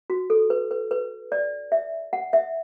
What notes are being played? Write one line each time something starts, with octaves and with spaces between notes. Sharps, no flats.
F#4
A4
B4
B4
B4
D5
E5
F#5
E5